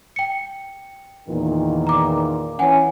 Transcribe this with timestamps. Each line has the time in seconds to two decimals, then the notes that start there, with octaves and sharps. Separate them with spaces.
0.16 G5 C#7
1.29 E2 A#2 D#3
1.87 A#5 D6
2.59 E3 C#4 F#5 G#5